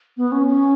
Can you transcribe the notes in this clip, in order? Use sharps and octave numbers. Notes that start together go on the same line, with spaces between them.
B3
C#4
C#4